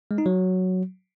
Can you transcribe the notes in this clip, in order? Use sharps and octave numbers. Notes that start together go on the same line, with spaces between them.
G#3
D#4
F#3